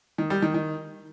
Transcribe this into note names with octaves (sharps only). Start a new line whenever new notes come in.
D#3
G3
D#3
D#3